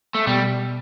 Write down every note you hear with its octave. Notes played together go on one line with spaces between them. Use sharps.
A3
B2 G3 B3